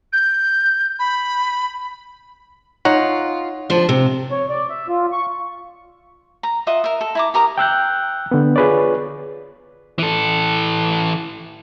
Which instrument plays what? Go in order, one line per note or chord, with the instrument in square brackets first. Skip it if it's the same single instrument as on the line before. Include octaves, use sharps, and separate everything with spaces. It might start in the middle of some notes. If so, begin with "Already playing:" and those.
[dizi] G6
B5
[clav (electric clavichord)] D#4 C#5 F#5 [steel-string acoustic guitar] F4
[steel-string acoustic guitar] F3 D4
C3
[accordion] C#5
D5
E5
F4
C#6
[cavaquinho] A#5
F4 D#5 E5 F#5
A#4 E5
A4
E4 A#5 D6
G4 A#4 A#5 D#6
[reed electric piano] G5 E6 F#6 G6
D3 B3
F4 G#4 B4 C#5 D5
[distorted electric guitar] E3 A4